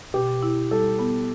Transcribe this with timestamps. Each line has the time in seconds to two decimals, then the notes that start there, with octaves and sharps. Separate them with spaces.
0.14 B2 G4
0.43 E4
0.71 G3 A4
0.99 B3